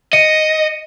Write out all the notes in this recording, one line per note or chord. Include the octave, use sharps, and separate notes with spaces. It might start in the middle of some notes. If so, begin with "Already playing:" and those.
D#5 C#7 D#7